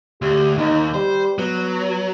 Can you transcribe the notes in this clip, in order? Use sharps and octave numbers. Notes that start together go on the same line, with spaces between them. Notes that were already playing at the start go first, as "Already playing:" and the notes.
D2 G4
D#2 D#4
G3 C5
F#3 B3